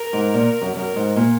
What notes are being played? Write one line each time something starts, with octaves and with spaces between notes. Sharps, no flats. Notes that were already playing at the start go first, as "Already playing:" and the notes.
Already playing: A#4
G#2
A#2
F#2
F#2 A#4
G#2
A#2